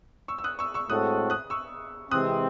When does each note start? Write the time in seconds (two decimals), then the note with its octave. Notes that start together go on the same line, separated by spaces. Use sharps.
0.28 C#6 E6
0.38 E6
0.44 D#6 F#6
0.59 C#6 E6
0.74 C#6 E6
0.89 A2 G#3 C4 F#4 A4 D#6 F#6
1.30 D#6 F#6
1.50 C#6 E6
2.11 C3 E3 G#3 C4 D#6 F#6